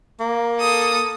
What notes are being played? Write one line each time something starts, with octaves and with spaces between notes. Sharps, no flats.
A#3
A4 D#6